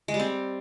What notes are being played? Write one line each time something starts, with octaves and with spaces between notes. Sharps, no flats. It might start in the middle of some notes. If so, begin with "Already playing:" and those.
G#3
G3
C4